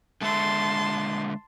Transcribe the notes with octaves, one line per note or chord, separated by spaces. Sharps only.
D3 G#3 E5 A5 C6